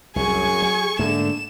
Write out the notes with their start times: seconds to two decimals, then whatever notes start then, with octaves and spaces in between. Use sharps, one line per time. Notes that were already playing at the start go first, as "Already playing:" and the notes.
0.16 C2 F#2 A2 G#4 G#5 C#6
0.62 F#3
0.99 G#2 D3 A3 A#3 E7